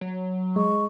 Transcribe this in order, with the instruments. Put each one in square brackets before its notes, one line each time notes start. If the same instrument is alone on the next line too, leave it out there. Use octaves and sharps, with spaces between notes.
[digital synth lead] F#3
[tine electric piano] G#3 [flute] C#6